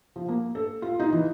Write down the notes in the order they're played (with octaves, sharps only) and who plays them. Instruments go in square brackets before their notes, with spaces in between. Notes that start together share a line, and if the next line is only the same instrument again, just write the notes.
[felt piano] F3
A#3
A4
F4
D#4
E3